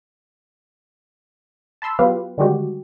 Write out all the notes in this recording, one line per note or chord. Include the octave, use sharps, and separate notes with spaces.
A5 B5 C6 E6
F#3 B3 F4 G4 B4 F5
D3 D#3 G3 G#3 F#4 G4